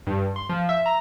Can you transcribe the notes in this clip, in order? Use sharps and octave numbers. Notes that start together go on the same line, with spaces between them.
G2
C6
F3
E5
A#5